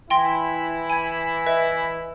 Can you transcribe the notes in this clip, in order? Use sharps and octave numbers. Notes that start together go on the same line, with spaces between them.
E3 E4 G5 C6 A#6
G#5 G#6
B4 D#5 E5